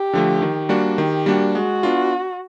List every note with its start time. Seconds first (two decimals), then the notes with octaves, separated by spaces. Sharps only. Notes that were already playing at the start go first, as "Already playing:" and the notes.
Already playing: G4
0.13 D3 F3 A3
0.42 D#3
0.69 G3 A#3 D4 F#4
0.98 D#3 G4
1.26 G3 A#3 D4 F#4
1.55 G#3 F#4
1.83 B3 D4 F4